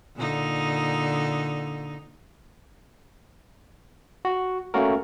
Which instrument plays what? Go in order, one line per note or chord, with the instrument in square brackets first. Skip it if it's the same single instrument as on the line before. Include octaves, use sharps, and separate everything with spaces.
[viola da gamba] A#2 D3 D#4
[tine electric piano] F#4
A3 A#3 C#4 F#4 A#4